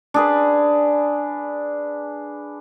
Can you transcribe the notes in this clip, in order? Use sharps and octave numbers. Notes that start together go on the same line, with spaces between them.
D4 G#4 B4